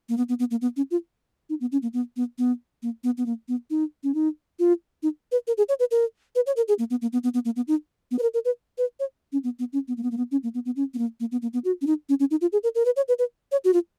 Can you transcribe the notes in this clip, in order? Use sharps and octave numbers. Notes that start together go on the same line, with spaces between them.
A#3
B3
B3
B3
A#3
B3
C#4
F4
D#4
B3
C#4
A#3
B3
B3
B3
A#3
B3
B3
A#3
B3
D#4
C#4
D#4
F4
D#4
B4
A#4
G#4
C#5
B4
A#4
B4
C#5
A#4
G#4
A#3
B3
A#3
B3
B3
B3
A#3
B3
D#4
B3
B4
A#4
A#4
B4
B4
C#5
C#4
B3
B3
C#4
B3
A#3
B3
A#3
B3
C#4
A#3
B3
B3
C#4
B3
A#3
A#3
B3
A#3
B3
F#4
C#4
D#4
C#4
C#4
D#4
F4
G#4
A#4
A#4
B4
C#5
B4
B4
C#5
F#4
F4